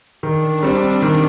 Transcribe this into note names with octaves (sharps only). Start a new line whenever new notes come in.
D#3 D4
G3 C4
D#3